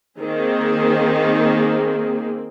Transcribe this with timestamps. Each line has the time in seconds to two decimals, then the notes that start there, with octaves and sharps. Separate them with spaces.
0.20 D#3 A#3 C4 G#4